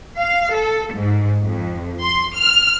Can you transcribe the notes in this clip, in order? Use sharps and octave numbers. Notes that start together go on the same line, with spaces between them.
F5
A4
G#2
F2
C6
F6